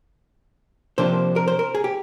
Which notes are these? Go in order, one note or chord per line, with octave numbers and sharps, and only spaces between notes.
C3 F3 A#3 D4 C5
A#4
C5
A#4
G#4
G4